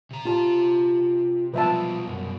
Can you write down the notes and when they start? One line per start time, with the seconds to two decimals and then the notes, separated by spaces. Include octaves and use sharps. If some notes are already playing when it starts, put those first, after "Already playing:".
0.11 C3 A#5
0.25 F4 G4 A5
1.54 C2 B2 F3 F#3 B4 E5 A5
2.07 F#2